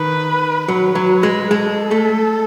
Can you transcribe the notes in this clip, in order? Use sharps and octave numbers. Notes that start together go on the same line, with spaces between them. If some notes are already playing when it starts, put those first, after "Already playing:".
Already playing: D#3 B4
F#3 B4
F#3
G#3
G#3 A4
A3